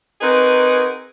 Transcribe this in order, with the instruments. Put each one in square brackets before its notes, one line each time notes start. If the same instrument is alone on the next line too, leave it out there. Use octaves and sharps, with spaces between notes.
[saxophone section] C4 D#4 F#4 G#4 A#4 B4